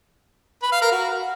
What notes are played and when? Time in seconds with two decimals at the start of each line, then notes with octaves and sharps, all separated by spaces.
0.62 B4
0.72 F5
0.81 A#4
0.91 F#4